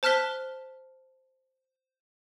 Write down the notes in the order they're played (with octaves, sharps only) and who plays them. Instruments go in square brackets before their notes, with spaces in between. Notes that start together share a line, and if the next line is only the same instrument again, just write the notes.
[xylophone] C5 A5 F6 F#6 B6 G7